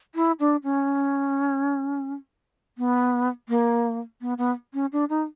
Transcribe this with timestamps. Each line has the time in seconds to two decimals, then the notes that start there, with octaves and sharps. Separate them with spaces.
0.15 E4
0.40 D4
0.64 C#4
2.78 B3
3.49 A#3
4.21 B3
4.38 B3
4.74 C#4
4.92 D4
5.09 D#4